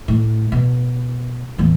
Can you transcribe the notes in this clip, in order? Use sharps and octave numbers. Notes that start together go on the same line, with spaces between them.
A2
B2
E2 A2